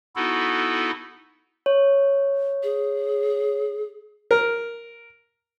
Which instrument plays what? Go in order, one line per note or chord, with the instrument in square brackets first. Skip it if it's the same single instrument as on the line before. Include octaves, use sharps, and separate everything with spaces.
[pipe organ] B3 D#4 E4 F#4 A4
[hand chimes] C#5
[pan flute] G#4
[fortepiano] A#4